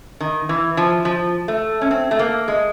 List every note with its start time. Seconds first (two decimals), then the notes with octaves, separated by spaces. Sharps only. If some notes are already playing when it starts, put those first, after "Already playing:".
0.20 D#3
0.49 E3
0.77 F3
1.05 F3
1.48 A3
1.81 C#4
1.91 C4
2.11 A3
2.19 A#3
2.48 G#3